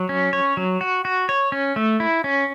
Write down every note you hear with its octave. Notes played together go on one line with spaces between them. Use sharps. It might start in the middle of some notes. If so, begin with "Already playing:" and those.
Already playing: F#3
C#4
C#5
F#3
F#4
F#4
C#5
C#4
A3
E4
C#4